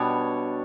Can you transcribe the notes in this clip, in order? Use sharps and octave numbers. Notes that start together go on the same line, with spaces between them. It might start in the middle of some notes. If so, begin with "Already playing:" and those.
Already playing: B2 G3 B3 D4 C#5